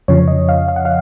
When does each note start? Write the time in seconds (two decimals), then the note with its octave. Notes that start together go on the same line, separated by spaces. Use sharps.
0.08 F2 C#3 F3 C#5
0.28 D#5
0.49 F5
0.68 F5
0.76 F#5
0.85 F5